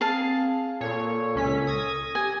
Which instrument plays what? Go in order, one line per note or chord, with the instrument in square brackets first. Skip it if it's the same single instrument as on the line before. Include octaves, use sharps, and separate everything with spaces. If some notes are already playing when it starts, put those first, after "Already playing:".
[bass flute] C4 [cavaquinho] G#4 F5 A5
[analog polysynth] A#2 C#5 [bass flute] A4
[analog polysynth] C#2 C#4 B6
D#6 G#6 A#6
[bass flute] G4 [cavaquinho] G#5